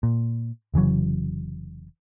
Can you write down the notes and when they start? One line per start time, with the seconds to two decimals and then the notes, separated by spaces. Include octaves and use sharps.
0.03 A#2
0.74 F1 C#3 E3 F#3